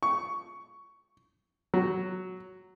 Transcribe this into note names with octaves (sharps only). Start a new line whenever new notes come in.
C#6
F#3